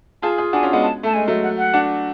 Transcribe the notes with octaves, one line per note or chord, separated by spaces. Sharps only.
F4 G#4 A5
F4 G#4 G#5
D4 F#4 G#5
C#4 F4
G#3 B3
A5
A3 A5
G#3 G#5
F#3 A3
F#5
F#5
D4 F#4